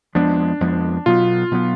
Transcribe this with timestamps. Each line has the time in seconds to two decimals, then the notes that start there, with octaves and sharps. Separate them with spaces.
0.15 F2 F3 G#3 B3 D4
0.60 F2 F3 G#3 B3
1.06 B2 F#3 B3 F4
1.51 B2 F#3 B3